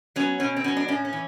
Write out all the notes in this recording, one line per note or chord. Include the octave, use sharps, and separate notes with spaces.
F#3 B3 C#4
B2 C#4
C4
F#3 B3 C#4
D4
A2 C#4
C#4
E3